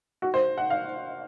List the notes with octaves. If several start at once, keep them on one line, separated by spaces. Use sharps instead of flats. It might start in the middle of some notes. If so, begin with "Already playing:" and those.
F#4
C5
F#5
F5